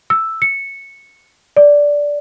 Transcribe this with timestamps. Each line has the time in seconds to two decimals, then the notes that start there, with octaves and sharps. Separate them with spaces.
0.10 E6
0.42 C#7
1.57 D5